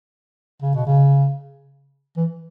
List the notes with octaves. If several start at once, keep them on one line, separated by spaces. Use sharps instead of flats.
C#3
B2
C#3
E3